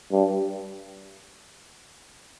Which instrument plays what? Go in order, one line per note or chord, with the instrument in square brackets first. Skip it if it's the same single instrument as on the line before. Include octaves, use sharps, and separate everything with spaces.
[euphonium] G2